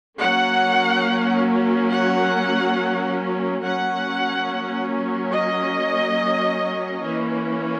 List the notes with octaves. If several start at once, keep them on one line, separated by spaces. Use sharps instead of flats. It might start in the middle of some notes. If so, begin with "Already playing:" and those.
F#3 A#3 C#4 F#5
F#5
F#3 A#3 C#4 F#5
D#5
E3 A#3 C#4